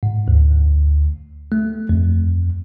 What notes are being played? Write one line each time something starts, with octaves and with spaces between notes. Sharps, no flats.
G#2
D2
A3
F2